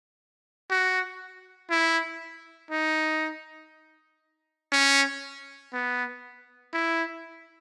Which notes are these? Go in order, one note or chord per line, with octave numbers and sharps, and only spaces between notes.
F#4
E4
D#4
C#4
B3
E4